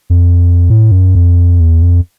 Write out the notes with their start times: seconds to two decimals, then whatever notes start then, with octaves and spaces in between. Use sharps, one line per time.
0.10 F2
0.70 A2
0.91 F#2
1.15 F2
1.60 E2
1.82 F2